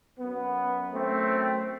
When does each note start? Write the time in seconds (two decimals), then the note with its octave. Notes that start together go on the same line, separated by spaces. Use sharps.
0.19 F#2 F#3 B3
0.92 A3 C4